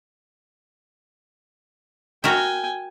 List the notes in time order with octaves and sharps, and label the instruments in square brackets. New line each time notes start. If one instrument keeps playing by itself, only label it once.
[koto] F#4 A#4 E5 [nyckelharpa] G5 G#5